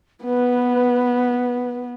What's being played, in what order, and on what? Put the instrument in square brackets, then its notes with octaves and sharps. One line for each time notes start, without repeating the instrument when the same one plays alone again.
[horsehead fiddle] B3 [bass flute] B4